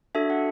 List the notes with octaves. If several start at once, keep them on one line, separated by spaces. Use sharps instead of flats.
D4 F#4 A4 E5
F#5